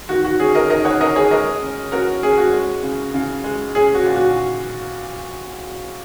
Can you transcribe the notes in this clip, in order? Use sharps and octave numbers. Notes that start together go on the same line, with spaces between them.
D#3 F#4
F#4
C#4 G#4
A#4 D#5
D#3 A#4 D#5
C#5 F#5
C#4 A#4 D#5
G#4 C#5
G#3 A#4 D#5
C#4
C#4 F#4 A#4
C#4 G#4
F#4
G#3
C#3
C#3
G#3
C#4 G#4
F#4
A#2
F#4